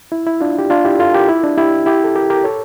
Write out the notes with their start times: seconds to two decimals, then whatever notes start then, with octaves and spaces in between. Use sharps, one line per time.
0.12 E4
0.27 E4
0.41 D4 F4
0.59 G4
0.70 D4 F4
0.85 E4 G4
0.99 F4 A4
1.14 G4 A#4
1.29 E4
1.44 D4
1.57 E4 G4
1.86 E4 G4
2.04 A4
2.15 G4 A#4
2.30 G4 A#4
2.44 A4 C#5